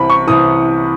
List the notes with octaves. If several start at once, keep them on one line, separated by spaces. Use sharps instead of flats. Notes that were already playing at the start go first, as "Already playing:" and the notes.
Already playing: C2 C3 E3 B5
C#6
C2 C3 E3 D#6